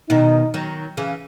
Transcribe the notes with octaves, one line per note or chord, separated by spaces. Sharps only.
B2 D#3 D#4
D#3 F#3
C#3 E3